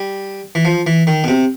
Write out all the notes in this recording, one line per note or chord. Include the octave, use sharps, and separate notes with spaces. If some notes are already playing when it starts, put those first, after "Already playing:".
Already playing: G3
E3
F3
E3
D#3
B2
C3